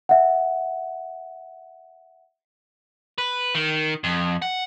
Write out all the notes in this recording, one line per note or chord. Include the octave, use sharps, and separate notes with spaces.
E5 F#5
B4
D#3
F2
F#5